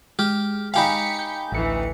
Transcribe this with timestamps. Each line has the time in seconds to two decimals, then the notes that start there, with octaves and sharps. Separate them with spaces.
0.19 G#3 G4 F6
0.74 D#4 G4 F5 G5 G#5 B5 B6 C#7
1.19 G6
1.52 A1 D2 E3 A3 C#7